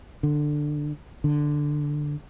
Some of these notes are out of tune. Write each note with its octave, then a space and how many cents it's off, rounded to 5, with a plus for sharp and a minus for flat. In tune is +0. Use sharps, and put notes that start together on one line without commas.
D3 +15
D3 +5